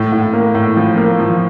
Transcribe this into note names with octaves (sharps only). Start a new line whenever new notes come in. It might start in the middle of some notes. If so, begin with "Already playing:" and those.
Already playing: A2
A2
A#3
A2
F3
A#3
F3